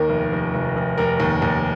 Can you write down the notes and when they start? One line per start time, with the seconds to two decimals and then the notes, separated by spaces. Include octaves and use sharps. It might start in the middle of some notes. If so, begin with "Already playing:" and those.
Already playing: D#2 D#3 A#4
0.09 F1
0.32 F1
0.54 F1
0.76 F1
0.98 F1 A#4
1.20 D#2
1.42 D#2